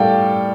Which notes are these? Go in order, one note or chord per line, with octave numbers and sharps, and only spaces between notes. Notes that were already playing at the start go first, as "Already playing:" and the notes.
Already playing: A2 G3 A4 D5 F5 G5